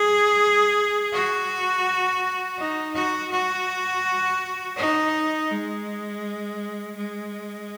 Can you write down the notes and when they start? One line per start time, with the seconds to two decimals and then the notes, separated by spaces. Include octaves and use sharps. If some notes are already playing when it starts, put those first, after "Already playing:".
Already playing: G#4
1.13 F#4
2.59 D#4
2.95 F#4
3.32 F#4
4.77 D#4
5.50 G#3
6.96 G#3